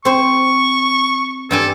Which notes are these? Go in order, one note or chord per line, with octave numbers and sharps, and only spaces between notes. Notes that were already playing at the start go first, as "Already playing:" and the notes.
C4 C5 C#6
G2 A4 G5 G#5